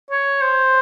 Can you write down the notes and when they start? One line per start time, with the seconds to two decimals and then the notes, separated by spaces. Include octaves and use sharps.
0.10 C#5
0.42 C5